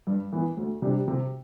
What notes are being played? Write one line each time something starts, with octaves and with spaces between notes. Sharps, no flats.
G2
E3 B3
D2
C3 G3 D4 G4
C3